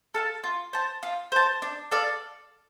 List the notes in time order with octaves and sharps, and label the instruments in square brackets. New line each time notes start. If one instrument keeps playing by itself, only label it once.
[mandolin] A4 F5 A5
F4
C5 A5
F4
C5 A5
D4
A4 D5 F5